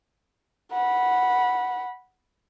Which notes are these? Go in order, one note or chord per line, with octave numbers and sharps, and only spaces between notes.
F#5 B5